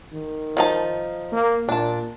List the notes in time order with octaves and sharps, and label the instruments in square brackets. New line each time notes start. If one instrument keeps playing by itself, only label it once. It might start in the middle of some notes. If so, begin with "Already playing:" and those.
[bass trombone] D#3
[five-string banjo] F3 D#4 A5
[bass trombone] A#3
[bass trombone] A#2 [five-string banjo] D4 A5